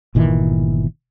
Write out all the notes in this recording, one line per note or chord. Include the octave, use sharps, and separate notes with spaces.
G1 A#2 D#3 E3